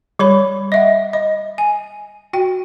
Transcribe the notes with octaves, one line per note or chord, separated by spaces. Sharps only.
G3 C#5 B5
D#5 E5 F#5
D#5
G#5
F#4 G5